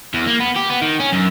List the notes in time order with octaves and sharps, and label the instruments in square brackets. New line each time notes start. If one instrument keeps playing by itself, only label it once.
[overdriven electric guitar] E2
A#3
B3
G4
B3
D#3
C#4
F#2